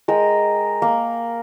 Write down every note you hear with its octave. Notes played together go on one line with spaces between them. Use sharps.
G#3 A#4 D#5 G5
A#3